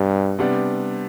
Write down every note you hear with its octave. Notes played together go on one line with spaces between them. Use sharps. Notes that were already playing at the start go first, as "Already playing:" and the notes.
Already playing: G2 B2 G3
C3 G3 B3 D4